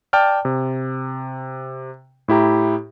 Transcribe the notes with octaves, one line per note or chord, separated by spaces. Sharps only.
D5 G5 A5 F6
C3
A2 E4 G4 A#5